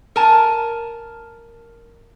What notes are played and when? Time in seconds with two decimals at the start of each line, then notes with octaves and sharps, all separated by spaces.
0.16 A#4 G#5 A5